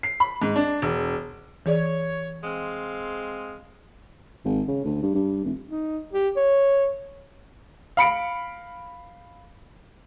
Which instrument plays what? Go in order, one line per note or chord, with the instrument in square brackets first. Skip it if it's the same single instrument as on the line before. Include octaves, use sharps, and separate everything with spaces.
[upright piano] C7
B5
G#2
D4
E1
[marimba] E3 G#4 D5 [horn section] C#5
[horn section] G#3 C4 F5
[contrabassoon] G#1
C#3
D2
G2
G2
F1
[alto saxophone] D#4
G4
C#5
[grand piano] F5 B5 C#7 D7